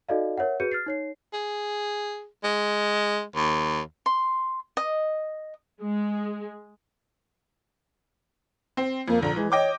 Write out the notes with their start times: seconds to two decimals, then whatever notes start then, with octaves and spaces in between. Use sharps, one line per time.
0.09 D#4 F#4 A4 D5 D#5 F5
0.38 A#4 C#5 E5 F#5
0.60 F#4 G#4 B4 G6 C#7 D#7
0.72 F6 A6 C7
0.86 D#4 C#5 C7
1.33 G#4
2.44 G#3
3.36 D#2
4.06 C6
4.77 D#5
5.82 G#3
8.77 C4
9.08 F2 A#3
9.22 A#1 D3 A#5
9.36 E3 G#3
9.52 C#5 D#5 G5 D6